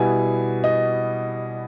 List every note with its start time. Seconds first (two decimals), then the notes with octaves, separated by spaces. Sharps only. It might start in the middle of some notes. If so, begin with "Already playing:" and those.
Already playing: B2 G3 B3 E4 G#5
0.64 D#5